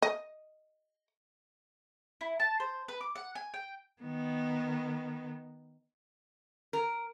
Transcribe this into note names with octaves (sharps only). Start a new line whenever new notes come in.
D#5
E4
A5
C5
B4
D6
F#5
G#5
G5
D#3 B3
A#4